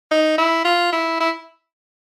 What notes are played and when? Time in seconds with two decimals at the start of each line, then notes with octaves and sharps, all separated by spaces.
0.11 D#4
0.38 E4
0.65 F4
0.93 E4
1.20 E4